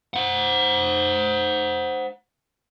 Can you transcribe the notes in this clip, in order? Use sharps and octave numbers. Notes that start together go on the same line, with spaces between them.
C5 F#5